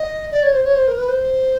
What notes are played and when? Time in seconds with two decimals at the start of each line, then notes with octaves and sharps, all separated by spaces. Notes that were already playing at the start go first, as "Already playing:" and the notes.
Already playing: D#5
0.32 D5
0.43 C#5
0.53 C5
0.64 C#5
0.75 C5
0.88 A#4
0.98 B4
1.09 C5